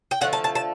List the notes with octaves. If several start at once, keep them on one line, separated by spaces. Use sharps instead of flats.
G5
D3 F3 A3 F#5
A5
A5
A5